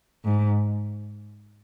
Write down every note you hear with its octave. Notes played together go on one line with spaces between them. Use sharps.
G#2